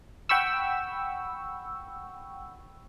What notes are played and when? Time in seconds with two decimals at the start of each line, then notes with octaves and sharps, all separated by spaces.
0.29 F#5 G5 B5 C#6 E6